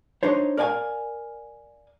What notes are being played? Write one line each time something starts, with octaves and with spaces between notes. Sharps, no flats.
D4 D#4 C5 C#5
A#4 D5 F5 G5 G#5